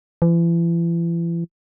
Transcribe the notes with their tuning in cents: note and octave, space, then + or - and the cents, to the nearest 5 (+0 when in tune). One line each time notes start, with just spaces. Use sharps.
E3 +40